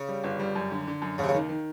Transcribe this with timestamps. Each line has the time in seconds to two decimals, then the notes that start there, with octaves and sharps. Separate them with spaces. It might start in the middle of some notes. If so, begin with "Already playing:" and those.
Already playing: C#3
0.08 G3
0.24 G1
0.39 G3
0.55 F#2
0.71 D3
0.87 D3
1.02 F#2
1.18 D#2 C#3
1.24 C3
1.28 C#3
1.34 D#3
1.49 D#3